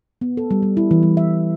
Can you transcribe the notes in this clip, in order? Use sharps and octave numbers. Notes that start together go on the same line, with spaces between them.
B3
A4
G3
G3
E4
E3
G3
E5